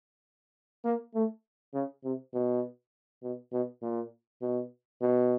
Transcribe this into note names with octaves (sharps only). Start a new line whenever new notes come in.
A#3
A3
C#3
C3
B2
B2
B2
A#2
B2
B2